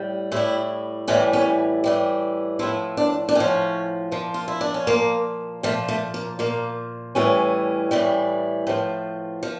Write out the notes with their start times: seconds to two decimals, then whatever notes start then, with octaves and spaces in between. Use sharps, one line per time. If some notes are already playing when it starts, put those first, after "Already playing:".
Already playing: A2 G3
0.32 A2 G3 E4
1.08 A2 E3 G3 C#4
1.33 C#4
1.84 A2 E3 G3
2.59 A2 F3 E4
2.97 D4
3.29 D4
3.35 A2 F3 C#4
4.12 A#2 F3
4.34 F4
4.48 E4
4.61 D4
4.74 C#4
4.87 A#2 F3 A#3
5.63 A#2 F3 A3
5.88 A3
6.14 A#3
6.39 A#2 F3 A#3
7.15 A2 E3 G3 C#4
7.91 A2 E3 G3
8.67 A2 F3
9.43 F3